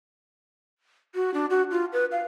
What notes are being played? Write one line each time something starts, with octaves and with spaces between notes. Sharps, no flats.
F#4
D4
F#4
F4
B4
F5